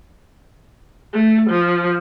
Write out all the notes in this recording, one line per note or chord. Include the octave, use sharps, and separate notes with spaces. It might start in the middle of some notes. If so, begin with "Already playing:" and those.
A3
F3